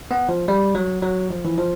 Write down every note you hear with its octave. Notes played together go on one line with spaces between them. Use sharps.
B3
F3
G3
F#3
F#3
F3
E3
F3